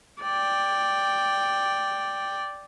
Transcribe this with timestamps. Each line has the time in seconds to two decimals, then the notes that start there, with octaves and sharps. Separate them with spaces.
0.23 D5 G5